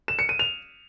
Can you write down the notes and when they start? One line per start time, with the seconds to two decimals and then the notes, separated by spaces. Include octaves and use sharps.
0.08 E7
0.19 C#7
0.29 D#7
0.39 F7